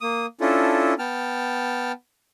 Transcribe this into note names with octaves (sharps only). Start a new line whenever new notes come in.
A#3 D#6
C#4 D4 E4 F4 A4
B3 G5 A5 F6